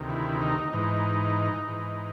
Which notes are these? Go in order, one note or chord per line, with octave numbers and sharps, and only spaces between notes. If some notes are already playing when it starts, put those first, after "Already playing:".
Already playing: D2 C3 D#3
E4
D#4
G#2 E3 D#4
G#2 E3